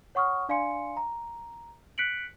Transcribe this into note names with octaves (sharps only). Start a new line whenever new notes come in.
C#5 F#5 C#6 D#6 F6
D4 D5 F5 G#5 C6 C#7
A#5
F#6 B6 C#7 D7 F#7